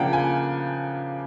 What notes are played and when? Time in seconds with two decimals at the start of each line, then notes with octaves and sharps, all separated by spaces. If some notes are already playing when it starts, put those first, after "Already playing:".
Already playing: C#3 F3 A#3 D4 F#5 G5
0.13 G#5